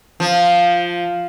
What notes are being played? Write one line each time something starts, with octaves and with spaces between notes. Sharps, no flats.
F3